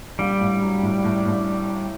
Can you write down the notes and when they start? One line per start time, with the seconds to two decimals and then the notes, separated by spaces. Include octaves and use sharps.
0.19 A#1 G3
0.41 A2
0.62 F#3
0.83 A2
1.04 A2
1.26 A2